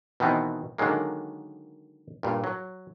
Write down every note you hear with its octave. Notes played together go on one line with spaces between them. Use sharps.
B2 D#3 E3 B3 C4
D3 D#3 F#3 G#3 A#3
G2 A#2
F#3